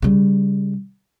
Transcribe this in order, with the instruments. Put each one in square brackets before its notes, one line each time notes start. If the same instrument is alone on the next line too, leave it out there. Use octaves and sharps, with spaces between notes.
[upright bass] C#3 G3